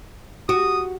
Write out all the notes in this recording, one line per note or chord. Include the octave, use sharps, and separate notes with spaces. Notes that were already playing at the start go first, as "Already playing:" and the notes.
F#4 D#6